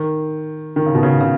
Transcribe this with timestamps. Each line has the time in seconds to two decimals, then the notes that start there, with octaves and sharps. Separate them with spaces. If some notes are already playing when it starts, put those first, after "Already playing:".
Already playing: D#3
0.76 D#3
0.86 C#3
0.95 B2
1.03 C#3
1.21 C#3